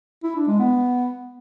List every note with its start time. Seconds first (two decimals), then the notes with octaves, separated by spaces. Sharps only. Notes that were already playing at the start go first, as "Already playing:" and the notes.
0.24 E4
0.35 D4
0.47 G#3
0.59 B3